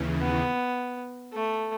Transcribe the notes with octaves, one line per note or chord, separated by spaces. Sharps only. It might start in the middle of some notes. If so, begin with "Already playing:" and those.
Already playing: D#2 C#3 E3
B3
A3